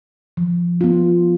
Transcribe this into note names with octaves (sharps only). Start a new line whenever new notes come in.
F3
B3 F4